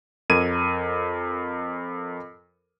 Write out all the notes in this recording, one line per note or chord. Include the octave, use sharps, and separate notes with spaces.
F2 A#4 G#6 D#7